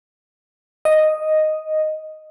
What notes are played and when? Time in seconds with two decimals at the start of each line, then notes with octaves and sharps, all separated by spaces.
0.85 D#5